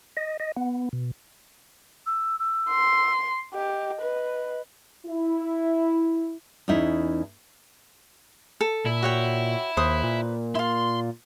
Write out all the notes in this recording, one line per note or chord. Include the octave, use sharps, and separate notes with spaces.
D#5
D#5
B3
B2
E6
E6
C6
G4 D#5
B4
E4
E2 C#4 D#4 E4
A4
A#2 E4
F#4 C#5 G5
D#2 B4 C5 D#6
A#2
E4 F4 C6